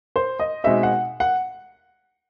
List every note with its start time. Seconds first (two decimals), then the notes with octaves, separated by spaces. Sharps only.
0.16 C5
0.39 D#5
0.64 B2 G#3 C4 D#4 E5
0.83 F#5
1.20 F#5